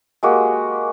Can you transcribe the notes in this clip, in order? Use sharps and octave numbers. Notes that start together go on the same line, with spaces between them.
G#3 A#3 F#4 G4